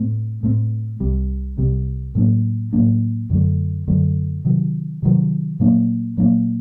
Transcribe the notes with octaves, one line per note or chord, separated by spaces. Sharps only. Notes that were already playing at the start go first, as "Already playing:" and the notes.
Already playing: A2 A3 C4
A2 A3 C4
C2 C3 G3
C2 C3 G3
A2 F#3 A#3 D4
A2 F#3 A#3 D4
F#2 D3 F#3 A3
F#2 D3 F#3 A3
C3 D#3 F#3
C3 D#3 F#3
A#2 F#3 A#3 D4
A#2 F#3 A#3 D4